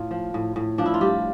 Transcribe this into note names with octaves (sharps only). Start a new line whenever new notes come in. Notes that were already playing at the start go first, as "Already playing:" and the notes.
Already playing: A2 F4
F3
A2
A2
F3 D4
E4
F4
G3 G4